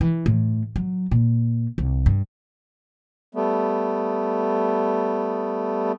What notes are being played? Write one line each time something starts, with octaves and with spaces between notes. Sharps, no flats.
E3
A2
F#3
A#2
C2
G2
G3 A3 B3